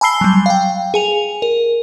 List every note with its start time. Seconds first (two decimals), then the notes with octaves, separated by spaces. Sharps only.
0.01 G#5 A5 B5 E6 C7 G7
0.21 F#3 G3
0.46 F5 G5
0.94 G#4 G#5 F7
1.42 A#4